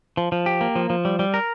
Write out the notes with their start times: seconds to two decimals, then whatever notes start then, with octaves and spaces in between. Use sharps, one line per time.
0.17 F3
0.32 F3
0.46 G4
0.61 A#3
0.76 F3
0.90 F3
1.05 G3
1.19 G3
1.34 A#4